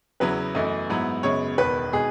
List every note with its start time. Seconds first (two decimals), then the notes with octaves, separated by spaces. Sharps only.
0.20 E2 C#3 F#3 B3 E4 B4
0.55 F#2 E3 A3 D#5
0.90 G#2 F#3 B3 E4
1.23 F#2 C#3 G#3 B3 C#5
1.58 E1 E2 D#3 B4
1.93 B2 G#3 D#4 G#4